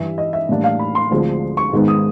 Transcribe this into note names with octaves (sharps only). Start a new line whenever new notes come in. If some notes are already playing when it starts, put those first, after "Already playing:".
Already playing: G2 E3 G3 E5
D#5
E5
A2 E3 G3 A#3 D4
F5
B5
C6
D2 D3 F3 G#3 C4
C#6
G#2 D#3 G#3 B3 D#4
D#6